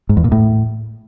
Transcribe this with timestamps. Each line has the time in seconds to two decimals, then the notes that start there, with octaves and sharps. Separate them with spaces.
0.09 G#2
0.17 E2
0.24 A#2
0.32 A2